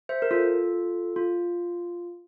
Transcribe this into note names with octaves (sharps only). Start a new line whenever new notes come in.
C5 E5
A#4
F4 A4
F4